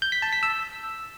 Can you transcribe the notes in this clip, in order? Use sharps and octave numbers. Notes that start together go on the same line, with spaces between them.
G6
B6
A5
B6
E6